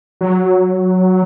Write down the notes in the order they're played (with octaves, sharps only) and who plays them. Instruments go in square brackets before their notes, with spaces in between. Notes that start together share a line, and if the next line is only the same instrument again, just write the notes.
[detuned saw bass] F#3